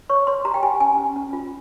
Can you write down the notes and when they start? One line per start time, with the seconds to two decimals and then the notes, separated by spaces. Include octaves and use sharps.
0.10 C#5 C#6
0.27 C#5 C6
0.45 G4 A#5
0.54 G5
0.63 G4 G#5
0.80 C#4 G#5
0.98 C#4
1.16 C#4
1.33 F4